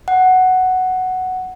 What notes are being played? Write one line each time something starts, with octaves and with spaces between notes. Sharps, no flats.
F#5